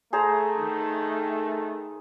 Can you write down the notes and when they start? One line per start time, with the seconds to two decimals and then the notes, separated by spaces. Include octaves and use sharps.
0.13 A3 G#4 C5 A#5
0.60 D#3